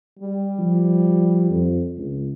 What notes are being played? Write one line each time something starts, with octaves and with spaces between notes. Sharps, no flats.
G3
F3
F2
C#2